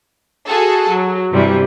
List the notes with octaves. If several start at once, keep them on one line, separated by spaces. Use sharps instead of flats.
F#4 G#4 A4
F#3
G2 C3 E3 G3